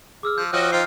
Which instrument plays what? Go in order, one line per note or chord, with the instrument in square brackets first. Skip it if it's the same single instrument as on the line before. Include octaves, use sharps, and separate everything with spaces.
[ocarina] G#4 [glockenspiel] D6 E6 F6
[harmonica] F3 [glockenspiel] G6
[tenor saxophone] F3 [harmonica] F#4 D#5 G5 [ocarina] C#5 [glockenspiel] F#6 G6
[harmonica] D#4 F4 G5 [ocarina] C5 [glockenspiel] F6 C7